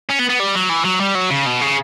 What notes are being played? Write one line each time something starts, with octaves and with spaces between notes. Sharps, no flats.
C#4
B3
B3
G3
F#3
E3
F#3
G3
F#3
C#3
B2
C#3